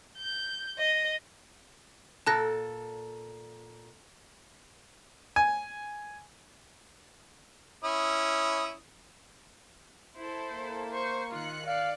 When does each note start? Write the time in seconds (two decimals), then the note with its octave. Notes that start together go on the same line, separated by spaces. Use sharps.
0.18 G6
0.79 D#5
2.26 A#2 A4 A5 F#6 A#6
5.36 G#5
7.84 C#4 E4 D#6
10.18 E4 A4 C5
10.50 A#3
10.91 C5 C#6
11.32 D#3 F4 F#6 C#7
11.67 D5 F5